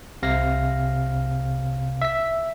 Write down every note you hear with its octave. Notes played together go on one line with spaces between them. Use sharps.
C2 C3 F5 A#6
E5 B6